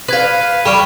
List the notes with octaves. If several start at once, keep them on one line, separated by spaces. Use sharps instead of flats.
B4 F5 F#6 G#6 B6
G3 B5 C#6 F6